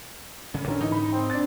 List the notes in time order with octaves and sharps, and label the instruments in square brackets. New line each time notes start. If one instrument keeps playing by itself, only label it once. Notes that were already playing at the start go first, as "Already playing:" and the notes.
[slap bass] E1 C#3 C#4
[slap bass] G#2 [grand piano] D3 C#4 A#4
[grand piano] E3 [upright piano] D#4
[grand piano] B5
C4
[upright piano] D4 A6